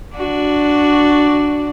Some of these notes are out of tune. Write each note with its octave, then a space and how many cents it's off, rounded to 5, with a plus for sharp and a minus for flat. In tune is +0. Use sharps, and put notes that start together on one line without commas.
D4 +0 F#4 +0 D5 +0